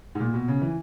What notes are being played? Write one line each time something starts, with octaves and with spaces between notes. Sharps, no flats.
G#2
A#2
B2
C#3
E3